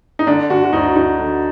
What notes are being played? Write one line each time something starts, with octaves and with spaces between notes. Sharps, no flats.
D#4
D3 D4
D3 F#4
F#4
D2 D#4
D2 D#4
D3